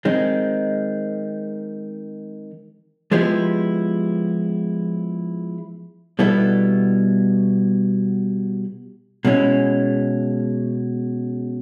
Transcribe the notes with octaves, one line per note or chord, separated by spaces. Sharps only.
D#3 G#3 C4
F3 G#3 B3 E4 G4
B2 G3 B3 E4 A4
B2 G#3 C#4 E4